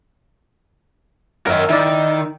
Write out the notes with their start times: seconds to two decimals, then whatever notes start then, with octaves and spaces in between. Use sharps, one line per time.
1.47 F#2 D#3 A#4 E5
1.70 D#3 E4 D5